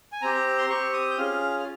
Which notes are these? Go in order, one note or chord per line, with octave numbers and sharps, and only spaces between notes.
G#5
C4 G4 A#5
C6
C4 G4 C#6
D#6
G6
C#4 F4 G#4 F6
F6